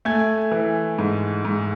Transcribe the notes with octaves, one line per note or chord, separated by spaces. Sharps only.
A3 G#5 G#6
E3
G#2
G#2